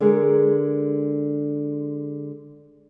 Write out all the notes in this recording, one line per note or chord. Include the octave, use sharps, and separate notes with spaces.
D3 G#3 G#4 A#4